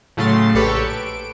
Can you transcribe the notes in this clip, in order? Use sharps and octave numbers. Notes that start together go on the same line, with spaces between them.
A2 C#3 F#3 A3 A5 C6
A#1 G4 A4 B4 C#5 C#7
D7